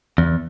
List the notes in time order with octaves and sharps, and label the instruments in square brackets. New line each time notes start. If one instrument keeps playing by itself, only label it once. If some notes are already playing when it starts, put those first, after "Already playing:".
[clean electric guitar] E2